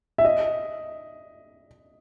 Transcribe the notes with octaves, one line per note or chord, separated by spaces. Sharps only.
E5
D#5